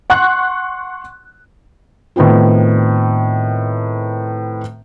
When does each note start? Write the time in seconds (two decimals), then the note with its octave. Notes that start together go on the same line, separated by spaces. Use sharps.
0.10 F#5 C6 C#6 F#6
2.16 A2 D#3 B3 C4 F4